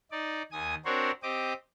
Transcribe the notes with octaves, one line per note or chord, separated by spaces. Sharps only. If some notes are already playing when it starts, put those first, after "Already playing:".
D#4 D5
D#2 G#5 D#6
C4 D4 F#4 A#4 C5 C#5
C4 G4 D#5 D6